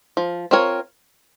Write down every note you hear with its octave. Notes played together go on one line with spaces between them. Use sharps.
F3
C4 F4 A#4 C#5